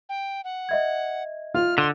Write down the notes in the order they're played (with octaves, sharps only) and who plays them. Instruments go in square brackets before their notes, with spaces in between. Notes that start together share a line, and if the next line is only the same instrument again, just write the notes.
[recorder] G5
F#5
[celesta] D#5 E5 G#6
[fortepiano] F4 [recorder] F6
[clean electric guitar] D3 [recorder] C6